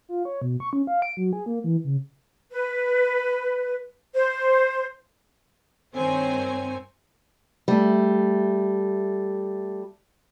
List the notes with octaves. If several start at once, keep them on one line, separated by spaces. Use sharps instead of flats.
F4
C#5
B2
C#6
C#4
F5
D7
F#3
G#4
A#3
E3
C#3
B4
C5
G2 D#3 C4 C5 C#5 G#5
G3 A3